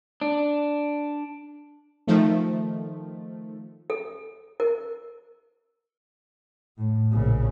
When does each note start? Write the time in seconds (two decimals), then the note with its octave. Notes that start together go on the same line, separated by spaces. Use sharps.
0.21 D4
2.07 D#3 F3 A3
3.90 A4
4.60 A#4
6.78 A2
7.12 A#1 C#3